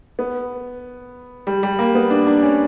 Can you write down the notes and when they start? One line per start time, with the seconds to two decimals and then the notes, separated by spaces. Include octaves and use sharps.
0.19 B3
1.47 G3
1.63 G3
1.79 A#3
1.95 B3
2.10 D4
2.27 D4
2.43 C#4